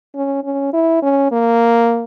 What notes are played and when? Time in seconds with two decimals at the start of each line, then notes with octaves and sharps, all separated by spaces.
0.15 C#4
0.44 C#4
0.73 E4
1.02 C#4
1.32 A#3